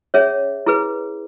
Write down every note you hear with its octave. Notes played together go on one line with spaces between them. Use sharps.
C#4 G#4 C#5 E5
E4 G#4 B4